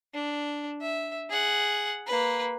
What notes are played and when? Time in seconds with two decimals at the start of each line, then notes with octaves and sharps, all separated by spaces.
0.13 D4
0.81 E5
1.29 G#4 F#5
2.07 A#3 B4